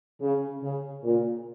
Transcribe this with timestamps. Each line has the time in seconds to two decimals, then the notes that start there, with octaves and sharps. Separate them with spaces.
0.20 C#3
0.62 C#3
1.03 A#2